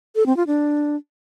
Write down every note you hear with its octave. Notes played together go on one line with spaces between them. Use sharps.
A4
C4
F4
D4